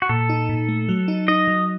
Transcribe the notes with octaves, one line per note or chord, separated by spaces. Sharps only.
F#4
A#2 A4
D#4
A#2
A3
F#3
D#4
D#4 D#5
F#3